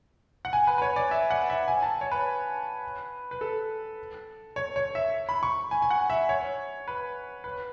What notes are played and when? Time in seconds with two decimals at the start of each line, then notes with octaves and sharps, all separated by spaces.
0.45 F#5
0.53 G#5
0.67 B4
0.78 B4
0.82 C#5
0.96 D5
1.11 E5
1.30 F#5
1.50 E5
1.68 G#5
1.82 A5
2.01 C#5
2.11 B4
3.31 B4
3.41 A4
4.56 C#5
4.76 C#5
4.95 E5
5.29 B5
5.43 C#6
5.71 G#5
5.82 G#5
5.90 F#5
6.10 E5
6.29 C#5
6.88 B4
7.44 B4